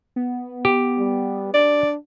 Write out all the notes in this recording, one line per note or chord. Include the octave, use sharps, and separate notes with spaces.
B3
G4
G3
D4 D5